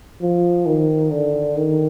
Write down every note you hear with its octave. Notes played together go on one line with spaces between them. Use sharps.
F3
D#3
D3
D#3